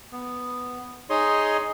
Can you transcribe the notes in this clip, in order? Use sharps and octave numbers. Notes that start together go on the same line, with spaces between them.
B3
D#4 G#4 C#5 D#5 C6